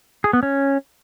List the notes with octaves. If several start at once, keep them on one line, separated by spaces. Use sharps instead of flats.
G#4
B3
C#4